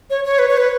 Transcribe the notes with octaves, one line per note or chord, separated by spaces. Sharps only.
C#5
C#5
B4
C#5
B4